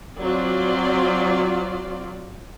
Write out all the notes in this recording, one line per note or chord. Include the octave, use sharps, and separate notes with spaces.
F#3 C4 F4 D5